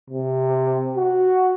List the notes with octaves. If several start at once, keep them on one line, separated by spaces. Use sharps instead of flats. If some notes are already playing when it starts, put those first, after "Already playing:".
C3
F#4